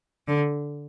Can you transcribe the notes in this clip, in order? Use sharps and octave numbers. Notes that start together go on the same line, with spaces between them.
D3